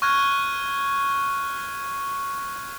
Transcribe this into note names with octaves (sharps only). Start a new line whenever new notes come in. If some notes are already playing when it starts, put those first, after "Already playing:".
C#6 F6 F#6 G#6